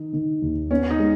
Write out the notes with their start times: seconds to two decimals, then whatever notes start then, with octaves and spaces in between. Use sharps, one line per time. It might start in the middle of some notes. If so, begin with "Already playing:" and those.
Already playing: D#3 D#4
0.13 D#3
0.42 D#2
0.70 B3 C#4
0.90 D#4
0.99 G#3